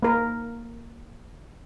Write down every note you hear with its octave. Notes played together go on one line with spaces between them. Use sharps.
A#3 A#4